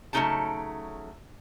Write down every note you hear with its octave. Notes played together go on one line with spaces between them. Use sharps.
C#3 F#3 A3 D#4 G5 A5